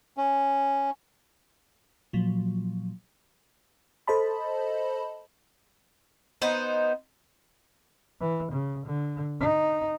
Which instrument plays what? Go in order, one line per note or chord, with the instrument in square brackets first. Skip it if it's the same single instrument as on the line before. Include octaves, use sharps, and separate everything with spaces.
[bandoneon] C#4
[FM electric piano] A#2 F3 F#3
A4 C5 D#5 A5 B5
[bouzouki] B3 D#4 C5
[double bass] E3
C#3
D3
D#4